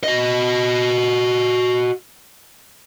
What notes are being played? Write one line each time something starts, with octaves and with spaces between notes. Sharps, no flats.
F#4 D#5